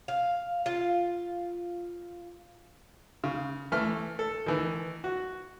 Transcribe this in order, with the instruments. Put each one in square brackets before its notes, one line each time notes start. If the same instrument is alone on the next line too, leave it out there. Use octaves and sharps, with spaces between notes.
[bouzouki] F5
F4
[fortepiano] C#3
E3 A3 F6
A4
D#3 E3
F#4